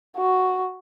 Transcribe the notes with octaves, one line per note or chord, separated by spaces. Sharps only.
F#4